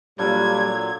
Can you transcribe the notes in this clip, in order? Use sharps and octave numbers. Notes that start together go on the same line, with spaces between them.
A#2 F#3 G3 D4 F4 A4 G#6